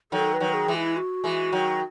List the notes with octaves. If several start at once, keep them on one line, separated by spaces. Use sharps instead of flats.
D#3 F#3 A4
B4
D#3 F#3
G#4
E3 G#3
E4
F#4
E3 G#3
D#3 F#3